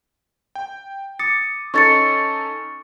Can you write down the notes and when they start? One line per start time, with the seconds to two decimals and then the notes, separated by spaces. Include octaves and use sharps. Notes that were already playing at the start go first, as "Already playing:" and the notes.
0.55 G5
1.19 D6 D#6 A6 C#7
1.74 C#4 D#4 A4 C#6 A6 C#7